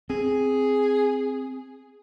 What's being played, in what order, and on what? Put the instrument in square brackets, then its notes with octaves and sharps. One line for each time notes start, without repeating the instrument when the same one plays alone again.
[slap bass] C4 [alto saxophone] G#4